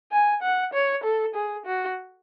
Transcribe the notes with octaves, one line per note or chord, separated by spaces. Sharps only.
G#5
F#5
C#5
A4
G#4
F#4